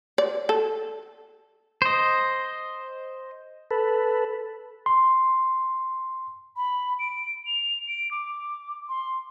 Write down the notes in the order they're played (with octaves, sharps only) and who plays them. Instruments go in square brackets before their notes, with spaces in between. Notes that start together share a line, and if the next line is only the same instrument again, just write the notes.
[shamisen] D5
A4
[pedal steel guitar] C5 D#5
[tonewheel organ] A4 B4
[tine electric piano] C6
[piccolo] B5
D7
F7
D7
D6
C6